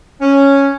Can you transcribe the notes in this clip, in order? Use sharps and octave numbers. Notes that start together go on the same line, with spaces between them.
C#4